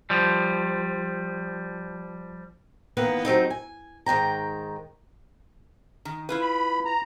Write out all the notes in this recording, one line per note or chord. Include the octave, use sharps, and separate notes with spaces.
F3 G3
D#3 E3 A#3 B3 B4
F#3 A3 C4 D#4
G#5
G#2 D#3 G5 A#5
D#3
E4 F4 B4
B5
A#5